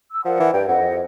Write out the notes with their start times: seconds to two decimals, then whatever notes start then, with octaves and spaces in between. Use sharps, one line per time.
0.13 E6
0.25 F3 A#4 D5 F#5
0.40 E3
0.53 G2 G5
0.68 F2 D#5 F#5